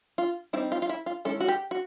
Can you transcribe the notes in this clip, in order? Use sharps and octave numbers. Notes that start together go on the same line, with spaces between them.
F4
G3 C4 D#4 E4
F4
F4
E4
F4
D#3 G#3 C#4 E4 A4
F#4
G4
F#4